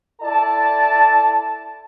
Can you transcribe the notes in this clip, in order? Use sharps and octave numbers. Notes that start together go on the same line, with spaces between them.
E4 A4 D5 A5